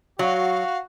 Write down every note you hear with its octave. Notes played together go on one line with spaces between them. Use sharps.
F#3 F#4 F5